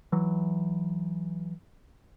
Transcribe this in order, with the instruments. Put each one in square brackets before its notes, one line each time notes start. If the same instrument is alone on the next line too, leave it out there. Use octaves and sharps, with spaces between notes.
[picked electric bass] E3 F#3